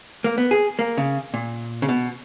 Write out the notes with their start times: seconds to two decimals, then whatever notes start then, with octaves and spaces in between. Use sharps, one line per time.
0.24 A#3
0.38 B3
0.51 G#4
0.79 A#3
0.98 C#3
1.34 A#2
1.82 C#3
1.89 B2